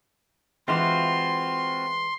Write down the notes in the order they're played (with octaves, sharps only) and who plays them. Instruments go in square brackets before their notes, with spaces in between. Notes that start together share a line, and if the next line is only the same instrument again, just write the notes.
[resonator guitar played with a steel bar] E3 G#3 [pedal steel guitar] C4 F4 F#4 [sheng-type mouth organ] C6